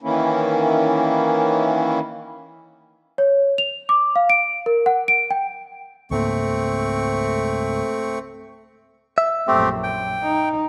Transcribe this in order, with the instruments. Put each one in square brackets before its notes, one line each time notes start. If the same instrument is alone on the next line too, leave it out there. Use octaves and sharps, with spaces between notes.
[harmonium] D#3 E3 A#3 C#4 E4
[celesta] C#5
F7
D6
F5
D7
A#4
F#5
D7
G5
[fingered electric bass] C#2 G#2 A#3 [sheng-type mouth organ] A3 C4 C#6
[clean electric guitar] E5
[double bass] A#1 F#2 [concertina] A3 C4 G4
[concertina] G5
[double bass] D#4